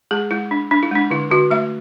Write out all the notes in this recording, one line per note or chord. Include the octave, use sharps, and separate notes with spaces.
G#3 G#4
G#3 E4
D4
D4
E4
G#3 D4
D3 E4
D3 F#4
A3 E5